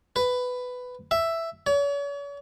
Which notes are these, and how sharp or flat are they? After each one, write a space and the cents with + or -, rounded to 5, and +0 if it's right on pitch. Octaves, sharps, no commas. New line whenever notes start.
B4 +10
E5 +5
C#5 +40